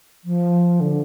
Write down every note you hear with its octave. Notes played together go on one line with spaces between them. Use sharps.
F3
D3